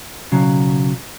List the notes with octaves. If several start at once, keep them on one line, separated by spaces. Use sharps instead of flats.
B1 C#3 F#3